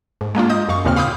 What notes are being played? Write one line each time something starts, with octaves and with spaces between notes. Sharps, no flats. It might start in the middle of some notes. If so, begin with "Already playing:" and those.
G#2
G#3 A#3 D4 F4
D#5 D#6 G6
F#2 F5 C#6
D#2 A#2 C#3 C4 F6
F5 B5 D6 D#6 F6 G6